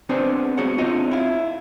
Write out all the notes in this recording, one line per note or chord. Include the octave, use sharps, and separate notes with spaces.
B3 C4 D4 G#4 B4 C5
B3 F#4 G#4 C#5 F#5
C4 D4 D#4 F4 C#5 D#5
E4 F5